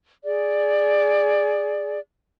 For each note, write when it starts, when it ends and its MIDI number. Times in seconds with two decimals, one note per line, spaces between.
0.24 2.00 68
0.24 2.00 74